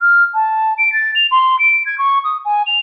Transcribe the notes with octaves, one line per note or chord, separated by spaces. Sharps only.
F6
A5
D7
A6
F7
C6
D7
G#6
C#6
D#6
G#5
F7